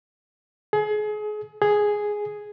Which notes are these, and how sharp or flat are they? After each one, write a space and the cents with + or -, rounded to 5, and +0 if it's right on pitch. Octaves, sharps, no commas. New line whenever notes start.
G#4 +30
G#4 +0